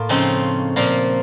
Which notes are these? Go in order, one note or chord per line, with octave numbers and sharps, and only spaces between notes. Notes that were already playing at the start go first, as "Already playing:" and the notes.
Already playing: A2 A#3 F4
C#3 F3 C4 D#4
A#2 F3 A#3